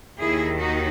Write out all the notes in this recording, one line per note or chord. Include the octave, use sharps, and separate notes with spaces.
D#2 D#3 E4 G#4
D#4 F#4